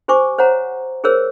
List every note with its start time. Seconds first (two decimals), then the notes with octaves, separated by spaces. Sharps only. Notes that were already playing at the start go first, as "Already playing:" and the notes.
0.08 G4 C5 G#5 C#6 D6
0.39 C5 C#5 F#5 A#5
1.04 G#4 A#4 C5 C#5 E6